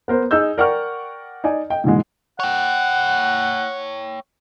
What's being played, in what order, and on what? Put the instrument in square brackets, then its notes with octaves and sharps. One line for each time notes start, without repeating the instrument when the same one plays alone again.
[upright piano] B3 A#4 C5
D#4 G#4 E6 G6
A#4 D5 F#5 G5 C#6 F6
D#4 D5 G#5
D#5 G5
G#2 B2 D3 E3 F#3 G#3
[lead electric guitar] C#5 G5 [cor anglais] F#5